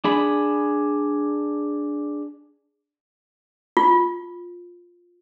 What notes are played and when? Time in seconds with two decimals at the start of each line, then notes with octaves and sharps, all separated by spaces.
0.04 D4 G#4 B5
3.77 F4